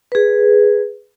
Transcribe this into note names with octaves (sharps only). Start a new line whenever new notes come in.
G#4 B4